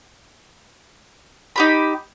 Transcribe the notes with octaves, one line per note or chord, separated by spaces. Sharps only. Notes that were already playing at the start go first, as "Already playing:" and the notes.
D#4 G4 B5